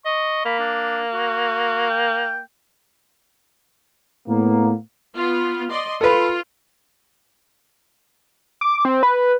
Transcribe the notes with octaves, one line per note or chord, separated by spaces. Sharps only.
D#5 C#6
A#3 B5
D4
F#4
G5
A2 A#3 B3
B3 F4
D5 D#5 C6
F4 A4 B4
D6
C4
B4